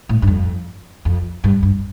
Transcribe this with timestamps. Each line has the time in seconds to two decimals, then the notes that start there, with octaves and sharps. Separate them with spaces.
0.09 A2
0.22 G2
0.27 F2
1.05 F2
1.44 G2
1.63 G2